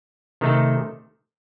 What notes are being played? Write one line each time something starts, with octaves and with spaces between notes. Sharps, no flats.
C3 D#3 A3 D#4 A4